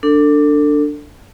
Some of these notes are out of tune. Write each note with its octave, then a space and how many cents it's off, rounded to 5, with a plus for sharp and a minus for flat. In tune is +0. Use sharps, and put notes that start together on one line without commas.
D4 +0 A4 +30